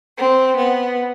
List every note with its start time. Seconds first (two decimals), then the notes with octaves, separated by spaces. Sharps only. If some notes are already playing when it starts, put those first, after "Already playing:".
0.17 C4
0.57 B3